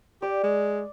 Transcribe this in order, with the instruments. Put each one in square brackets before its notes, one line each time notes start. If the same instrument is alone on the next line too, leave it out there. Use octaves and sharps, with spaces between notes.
[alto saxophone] G4 [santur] D5
[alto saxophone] G#3